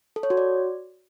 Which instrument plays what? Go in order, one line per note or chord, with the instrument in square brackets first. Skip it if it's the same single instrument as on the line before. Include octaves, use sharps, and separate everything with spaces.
[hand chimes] A4
C#5
F#4
D5